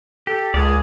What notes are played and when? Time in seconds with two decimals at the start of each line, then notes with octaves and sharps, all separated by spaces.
0.27 G4 A4
0.54 C#2 G#3 A#3 G#4 D5